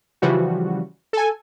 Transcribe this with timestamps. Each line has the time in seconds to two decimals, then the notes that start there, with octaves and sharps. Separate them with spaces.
0.22 C#3 E3 F3 G3 F#4
1.13 A4 G#5